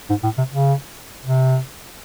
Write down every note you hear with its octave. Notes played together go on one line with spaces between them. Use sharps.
G#2
A2
C3
C#3
C3